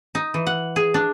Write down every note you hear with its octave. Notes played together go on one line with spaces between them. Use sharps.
D#4
E3
F#5
G#4
D4